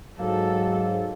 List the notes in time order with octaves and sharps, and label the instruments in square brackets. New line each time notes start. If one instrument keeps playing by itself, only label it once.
[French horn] G#2 [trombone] F#3 [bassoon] A#3 [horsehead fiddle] A4